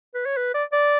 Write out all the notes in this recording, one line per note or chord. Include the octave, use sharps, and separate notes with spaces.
B4
C#5
B4
D5
D5